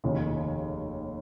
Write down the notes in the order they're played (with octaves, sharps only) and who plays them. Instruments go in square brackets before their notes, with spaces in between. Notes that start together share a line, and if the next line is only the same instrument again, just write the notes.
[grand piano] F1 D#2 C#3